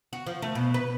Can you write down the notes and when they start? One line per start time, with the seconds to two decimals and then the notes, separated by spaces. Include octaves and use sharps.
0.13 F#4
0.26 F3
0.42 A3
0.55 B2
0.74 B4